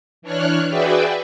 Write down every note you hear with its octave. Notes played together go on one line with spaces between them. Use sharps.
E3 D4 C#5 F6 F#6
F#4 G#4 B4 D5 E5 G5